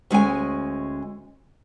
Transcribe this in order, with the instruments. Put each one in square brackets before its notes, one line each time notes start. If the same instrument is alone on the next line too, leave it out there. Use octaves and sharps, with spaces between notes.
[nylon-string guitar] D2 G#3 C#4 G#5